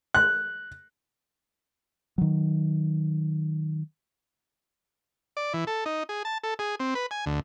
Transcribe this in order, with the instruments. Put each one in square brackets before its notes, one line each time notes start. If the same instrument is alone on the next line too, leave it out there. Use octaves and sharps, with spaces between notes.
[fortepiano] F#6
[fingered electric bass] D#3 F#3
[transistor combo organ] D5
E3
A4
D#4
G#4
A5
A4
G#4
C4
B4
G#5
D2